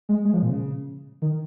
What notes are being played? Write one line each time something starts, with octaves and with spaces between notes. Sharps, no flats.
G#3
G#3
F3
A#2
C#3
D#3